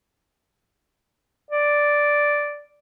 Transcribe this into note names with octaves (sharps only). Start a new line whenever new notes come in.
D5